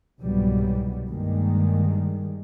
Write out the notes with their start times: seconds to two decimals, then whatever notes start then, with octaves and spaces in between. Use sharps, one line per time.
0.21 C2 G#2 B2 F#3 G3 B3
1.08 G2 D#3 G3 G#3 A#3